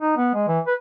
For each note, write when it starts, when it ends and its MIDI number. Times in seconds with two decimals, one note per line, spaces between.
0.01 0.14 63
0.17 0.30 59
0.34 0.46 56
0.48 0.59 52
0.67 0.74 71